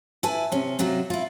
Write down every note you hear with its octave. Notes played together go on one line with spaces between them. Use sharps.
E4 B4 G#5 A5
C3 C#4
C3 F#3 F4 F#4
E4 F4